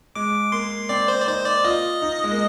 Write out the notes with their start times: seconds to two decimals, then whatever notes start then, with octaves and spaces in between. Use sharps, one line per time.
0.15 G#3 D6
0.52 A#3 C6
0.89 C4 D5
1.08 C5
1.20 D5
1.27 D#4 C5
1.45 D5
1.64 F4 D#5
2.02 D#4
2.24 G#3
2.31 A#3